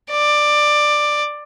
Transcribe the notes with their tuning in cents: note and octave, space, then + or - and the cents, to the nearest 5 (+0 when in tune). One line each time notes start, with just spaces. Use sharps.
D5 +15